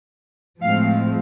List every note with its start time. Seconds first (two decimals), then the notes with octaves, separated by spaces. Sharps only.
0.62 A2 F3 G#3 C4 F5